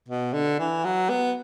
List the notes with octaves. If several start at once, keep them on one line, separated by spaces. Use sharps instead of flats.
B2
D3
E3
F#3
B3